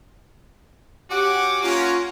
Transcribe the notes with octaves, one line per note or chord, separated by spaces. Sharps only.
C#4 F#4 G4 F#5 D6
A#3 C#4 F4